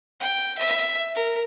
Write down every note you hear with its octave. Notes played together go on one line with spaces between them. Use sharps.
G5
E5
A#4